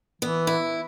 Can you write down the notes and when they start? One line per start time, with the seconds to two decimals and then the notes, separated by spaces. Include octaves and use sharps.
0.22 E3 B3
0.47 E4